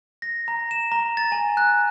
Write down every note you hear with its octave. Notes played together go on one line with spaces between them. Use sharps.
A#6
A#5
E7
A#5
A6
G#5
F#6